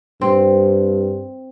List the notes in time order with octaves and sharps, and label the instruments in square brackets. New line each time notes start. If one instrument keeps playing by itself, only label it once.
[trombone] G2 [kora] C4